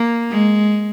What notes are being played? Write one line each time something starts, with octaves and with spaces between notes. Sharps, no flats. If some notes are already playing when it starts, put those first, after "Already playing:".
Already playing: A#3
G#3